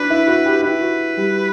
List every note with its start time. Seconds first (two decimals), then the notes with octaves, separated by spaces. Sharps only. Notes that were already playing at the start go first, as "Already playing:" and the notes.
Already playing: D4 E4 F#4 B4
0.10 E4
0.28 F#4
0.46 G4
0.63 E4 B4
0.81 F#4
1.17 G3